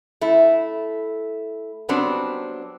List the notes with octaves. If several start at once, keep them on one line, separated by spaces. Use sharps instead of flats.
A3 E4
F#3 G3 B3 C4 D4